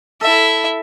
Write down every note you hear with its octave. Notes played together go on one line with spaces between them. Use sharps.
E4 A4 E5